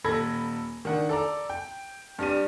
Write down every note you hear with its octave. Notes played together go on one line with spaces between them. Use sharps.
D#1 A4 B5 G#6 A#6
D#3 D4 F#5
A4 D5 A#5
G5
G2 G3 D#7